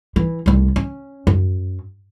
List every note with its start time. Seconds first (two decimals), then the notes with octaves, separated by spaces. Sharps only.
0.16 E3
0.46 C2 A3
0.76 C#4
1.27 F#2